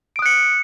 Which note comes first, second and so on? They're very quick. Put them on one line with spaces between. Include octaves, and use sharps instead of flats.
D7 D#6 F#6 C#7